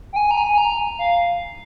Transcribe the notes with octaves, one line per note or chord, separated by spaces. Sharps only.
G5
G#5
A#5
G#5
A#5
F5